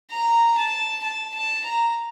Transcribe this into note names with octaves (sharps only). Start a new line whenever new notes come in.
A#5
A5
A5
A5
A#5